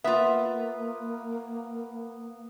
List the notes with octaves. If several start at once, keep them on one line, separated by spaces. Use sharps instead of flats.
A#3 B3 F4 E5